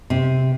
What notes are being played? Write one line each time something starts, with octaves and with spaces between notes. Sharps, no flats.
C3